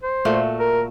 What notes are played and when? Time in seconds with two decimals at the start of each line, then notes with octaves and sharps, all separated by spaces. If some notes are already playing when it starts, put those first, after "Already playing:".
0.03 C5
0.25 A#2 A3 F#4
0.60 A#4